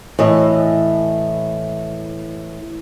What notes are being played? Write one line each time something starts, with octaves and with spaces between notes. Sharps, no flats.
A2 E3 D#5